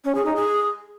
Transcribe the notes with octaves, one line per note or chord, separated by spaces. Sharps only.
C#4
G#4
D#4
G#4